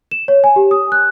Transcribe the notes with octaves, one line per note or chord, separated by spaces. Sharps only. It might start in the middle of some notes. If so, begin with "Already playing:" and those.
E7
C#5
G#5
G4
D#6
F#6